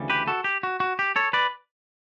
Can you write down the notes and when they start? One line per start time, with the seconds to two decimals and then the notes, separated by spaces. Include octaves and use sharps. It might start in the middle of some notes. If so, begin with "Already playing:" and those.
Already playing: D2 C#3 E3 G3
0.10 G4 B4
0.27 F#4 A4
0.44 G4
0.63 F#4
0.80 F#4
0.99 G4
1.16 A4 C#5
1.33 B4 D5